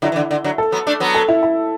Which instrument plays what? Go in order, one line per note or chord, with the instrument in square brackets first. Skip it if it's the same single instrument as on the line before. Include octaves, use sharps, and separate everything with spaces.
[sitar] D3 F#3 [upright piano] E4
[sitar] E3
D3
D3
D3 F#3
[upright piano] A4
[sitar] F#3 B3
A3 D4
F#3 B3
[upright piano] A4
E4
E4